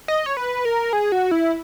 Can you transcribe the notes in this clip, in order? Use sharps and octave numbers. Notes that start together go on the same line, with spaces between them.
D#5
C#5
B4
A#4
G#4
F#4
E4